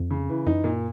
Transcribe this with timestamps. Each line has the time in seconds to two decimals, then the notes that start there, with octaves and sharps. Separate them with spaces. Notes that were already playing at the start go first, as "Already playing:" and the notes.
Already playing: F2
0.11 C#3
0.29 E3
0.47 F#2 D#4
0.64 A#2